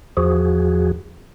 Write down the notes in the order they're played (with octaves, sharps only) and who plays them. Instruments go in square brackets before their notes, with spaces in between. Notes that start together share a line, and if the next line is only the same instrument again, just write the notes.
[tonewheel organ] E2 F3 F#4 G#4